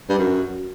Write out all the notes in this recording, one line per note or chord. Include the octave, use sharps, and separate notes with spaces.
G2
F#2